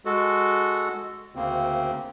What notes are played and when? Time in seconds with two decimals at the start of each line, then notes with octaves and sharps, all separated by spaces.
0.05 G#3 F#4 A4
1.36 D2 C#3 A#3 C4